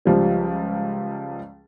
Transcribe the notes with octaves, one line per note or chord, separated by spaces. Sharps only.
C#2 F3 G3